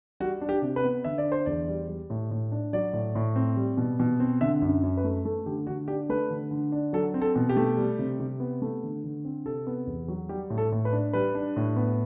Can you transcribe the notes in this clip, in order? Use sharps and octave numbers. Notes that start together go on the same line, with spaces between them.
G3 F#4
D4
G4
C3
B4
B3
D3 E5
D5
D4
C5
E2 D5
G3
G3
A2
A2
D4
F#3 D5
A2
A2
C4
G3
B2
B2
C4
D3 E5
F#2
F#2
B4
A3
A3 A4
D3 G4
D3 F#4
D4 G4
A3 B4
D3
D3
D4
F#3 A4
C4
A4
B2
G4
A3
G3
C3
C3
B3
A3
D3
D3
C4
C3 A4
B3
E2
F#3
G3 G4
A2
A4
A2
B4
D4
G3 B4
D4
A2
B3